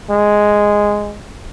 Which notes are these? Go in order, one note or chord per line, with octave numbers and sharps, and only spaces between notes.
G#3